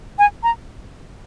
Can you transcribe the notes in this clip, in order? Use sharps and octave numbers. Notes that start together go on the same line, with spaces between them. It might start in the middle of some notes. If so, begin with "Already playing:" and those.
G#5
A#5